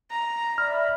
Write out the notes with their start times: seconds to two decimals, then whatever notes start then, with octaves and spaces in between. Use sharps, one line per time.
0.10 A#5
0.58 D5 E5 B5 F6